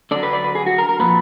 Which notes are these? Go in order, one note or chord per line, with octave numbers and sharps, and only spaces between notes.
D3 F#3 D5
B4
D5
B4
G#4
F#4
A#4
A#4
A#2 F3 B4